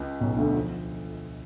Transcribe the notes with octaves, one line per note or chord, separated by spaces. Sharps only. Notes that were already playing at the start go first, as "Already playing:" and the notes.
Already playing: C#2 C#3
B1 B2
D2 D3
F3